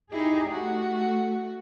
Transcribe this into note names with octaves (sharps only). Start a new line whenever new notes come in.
D#4 E4 G4 G#4
A3 F#4